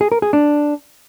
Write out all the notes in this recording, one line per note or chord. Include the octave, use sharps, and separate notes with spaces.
G#4
A#4
G#4
D4